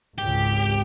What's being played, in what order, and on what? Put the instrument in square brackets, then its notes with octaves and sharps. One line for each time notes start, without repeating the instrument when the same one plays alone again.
[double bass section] G#1 C#2 [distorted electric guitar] G4